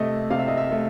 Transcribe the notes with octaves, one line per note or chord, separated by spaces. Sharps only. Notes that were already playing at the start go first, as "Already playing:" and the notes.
Already playing: C3 A3 D#5
C3 F5
E5
D#5
E5
A3